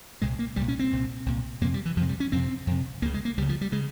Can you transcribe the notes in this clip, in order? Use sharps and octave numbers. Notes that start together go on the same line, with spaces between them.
C2 A#2 G#3
A#3
C2 A#2 G3
C#4
C4
C2 A#2
C2 A#2
F2 C3 A#3
G3
E3
F2 C3 F3 G#3
G3
C#4
F2 C3 C4
F2 C3
C#2 C#3 A#3
G#3
A#3
C#2 C#3 G3
F3
G3
C#3 G#3